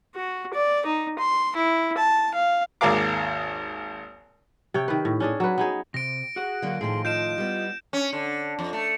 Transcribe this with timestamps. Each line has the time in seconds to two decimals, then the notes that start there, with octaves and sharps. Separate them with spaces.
0.15 F#4
0.54 D5
0.86 D#4
1.19 C6
1.56 E4
1.97 A5
2.34 F5
2.81 G#1 D#2 G#4 A#4 F5 D6
4.74 C3 C#5 G5
4.88 D#3 B4
5.05 A2
5.20 C#4 D4 G#4
5.40 F#3 B4
5.58 B3 D#4 G#4
5.94 C3 A#6 D7
6.36 F#4 G#4 F#5
6.62 D3 F#3 A#3
6.81 A2 D#3 F3 G#4 C6
7.05 F4 D#5 G6 D7 E7
7.38 G3 B3
7.93 C#4
8.13 D3
8.59 F2
8.73 A3